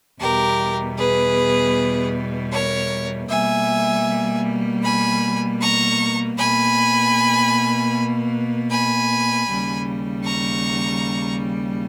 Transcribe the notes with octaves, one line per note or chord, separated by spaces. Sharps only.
E2 B2 G3 G4 A#4
G#4 B4
A#4 C#5
B2 G3 A#3 E5 G#5
G#5 B5
A#5 C#6
B2 A#3 G#5 B5
G#5 B5
D#2 C#3 G3
A#5 C#6